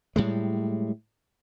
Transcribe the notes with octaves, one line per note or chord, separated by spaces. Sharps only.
A2 G3 G#3